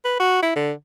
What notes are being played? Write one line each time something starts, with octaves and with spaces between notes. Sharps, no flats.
B4
F#4
E4
D3